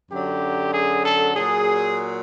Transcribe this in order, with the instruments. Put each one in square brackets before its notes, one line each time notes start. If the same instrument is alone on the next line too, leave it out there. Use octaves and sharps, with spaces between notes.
[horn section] F#2 D3 F#3 G4
G#4
A4
A#2 F#3 G#4